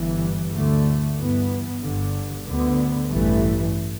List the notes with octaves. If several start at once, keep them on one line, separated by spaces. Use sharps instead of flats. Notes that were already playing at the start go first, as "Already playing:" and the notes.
Already playing: G1 G2 E3
D2 D3 A3
G2 E3 B3
G1 G2 D3
D2 D3 B3
A1 G2 E3 A3